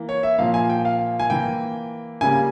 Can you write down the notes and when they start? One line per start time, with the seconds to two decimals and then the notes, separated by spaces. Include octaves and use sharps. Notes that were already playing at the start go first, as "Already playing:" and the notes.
Already playing: E3 A#3
0.09 C#5
0.23 E5
0.38 A#2 F3 A#3 F5
0.54 G#5
0.69 G5
0.85 F5
1.20 G#5
1.30 E3 A#3 G5
2.21 C#3 G3 A#3 G#5